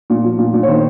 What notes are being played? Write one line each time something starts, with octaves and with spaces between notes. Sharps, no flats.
A#2
F3
A#2
A#2
C#5
D#3 C5